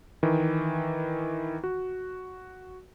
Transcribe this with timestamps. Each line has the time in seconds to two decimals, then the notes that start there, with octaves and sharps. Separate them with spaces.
0.23 D#3 E3
1.64 F#4